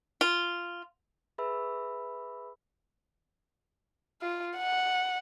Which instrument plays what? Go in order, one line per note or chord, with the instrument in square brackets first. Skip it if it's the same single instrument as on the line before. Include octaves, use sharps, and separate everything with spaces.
[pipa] F4
[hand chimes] G#4 B4 E5 B5 E6
[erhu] F4
F#5